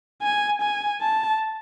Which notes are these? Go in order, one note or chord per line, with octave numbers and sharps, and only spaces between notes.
G#5
G#5
A5